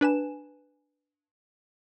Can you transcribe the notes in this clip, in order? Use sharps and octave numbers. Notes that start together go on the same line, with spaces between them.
D4 B4 G#5 E7